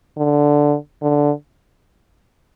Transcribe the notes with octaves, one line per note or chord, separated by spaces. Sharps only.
D3
D3